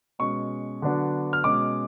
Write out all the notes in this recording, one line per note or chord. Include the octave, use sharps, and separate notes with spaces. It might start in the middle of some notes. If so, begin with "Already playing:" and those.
B2 G#3 C#4 C#6
D3 F#3 B3 D4
F6
B2 G#3 C#4 D6